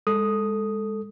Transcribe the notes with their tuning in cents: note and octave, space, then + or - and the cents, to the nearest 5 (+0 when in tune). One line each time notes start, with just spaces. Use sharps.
G#3 -20 A4 +0 D#6 +0